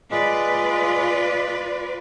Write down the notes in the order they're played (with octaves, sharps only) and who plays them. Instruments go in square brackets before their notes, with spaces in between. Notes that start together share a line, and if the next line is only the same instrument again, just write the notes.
[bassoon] G#3 [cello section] F4 B4 D5